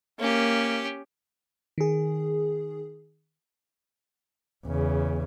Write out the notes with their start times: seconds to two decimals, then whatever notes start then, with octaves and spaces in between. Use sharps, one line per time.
0.20 A#3 C#4 G4
1.78 D#3 G#4
4.67 E2 C#3